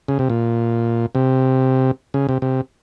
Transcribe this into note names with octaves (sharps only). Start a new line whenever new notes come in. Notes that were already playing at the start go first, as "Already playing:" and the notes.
C#3
C3
A#2
C3
C#3
C3
C3